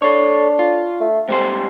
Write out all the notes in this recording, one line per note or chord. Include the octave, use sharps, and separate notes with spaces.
D4 A4 C#5
F4
A3
G#2 G3 C4 C5